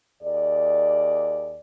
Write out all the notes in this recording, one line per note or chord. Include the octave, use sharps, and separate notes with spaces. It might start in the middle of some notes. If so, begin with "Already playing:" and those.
D#2 G#4 D5